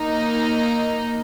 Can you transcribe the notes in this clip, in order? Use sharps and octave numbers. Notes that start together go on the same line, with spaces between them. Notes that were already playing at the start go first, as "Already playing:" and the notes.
Already playing: A#3 D#4